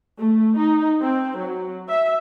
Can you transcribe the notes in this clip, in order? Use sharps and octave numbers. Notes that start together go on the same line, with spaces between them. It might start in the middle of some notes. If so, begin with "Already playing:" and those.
A3
D#4
C4
F#3
E5